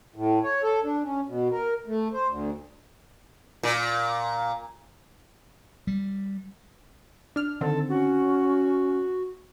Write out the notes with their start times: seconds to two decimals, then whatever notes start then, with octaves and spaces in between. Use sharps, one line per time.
0.16 A2
0.44 C#5
0.63 A4
0.84 D4
1.04 C#4
1.28 B2
1.52 A#4
1.87 A3
2.13 C5
2.28 D2
3.63 A#2
5.87 G3
7.36 D4 F6
7.61 D3 D#3 C4 A4
7.88 C#4 F#4